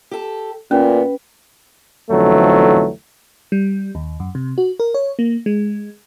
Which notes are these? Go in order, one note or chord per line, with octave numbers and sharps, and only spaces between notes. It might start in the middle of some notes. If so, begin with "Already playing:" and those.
G4 A4
A#2 B3 C#4
B1 F2 D3 E3 F#3 A3
G3
D#2
F#2
C3
F#4
A#4
C#5
A#3
G#3